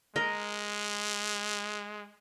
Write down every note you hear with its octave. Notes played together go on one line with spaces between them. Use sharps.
G#3 A#4 D#5